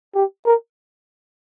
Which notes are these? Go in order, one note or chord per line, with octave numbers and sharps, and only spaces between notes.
G4
A#4